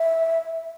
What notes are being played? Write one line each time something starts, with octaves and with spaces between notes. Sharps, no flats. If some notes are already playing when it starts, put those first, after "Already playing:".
Already playing: E5